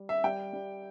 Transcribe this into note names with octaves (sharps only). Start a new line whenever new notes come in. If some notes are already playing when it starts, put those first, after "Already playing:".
Already playing: G3
E5
G3 G5
G3